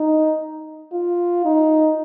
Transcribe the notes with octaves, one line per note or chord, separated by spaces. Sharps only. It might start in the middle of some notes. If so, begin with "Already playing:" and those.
Already playing: D#4
F4
D#4